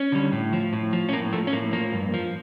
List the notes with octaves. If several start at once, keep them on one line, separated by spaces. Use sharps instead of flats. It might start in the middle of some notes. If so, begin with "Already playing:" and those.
Already playing: C#4
D3 G3
A2
F3
A2
F3
C#4
A2 A#3
F3 A3
C#4
A2 A#3
F3 A#3
G2
F3